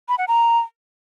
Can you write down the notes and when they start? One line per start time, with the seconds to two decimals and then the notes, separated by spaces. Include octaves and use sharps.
0.08 B5
0.18 F#5
0.28 A#5